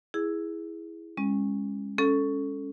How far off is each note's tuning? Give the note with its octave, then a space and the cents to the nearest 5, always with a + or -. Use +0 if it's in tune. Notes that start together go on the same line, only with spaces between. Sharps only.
E4 +0 G#4 +0
G#3 -30 C#4 -15
C#4 +5 A4 +0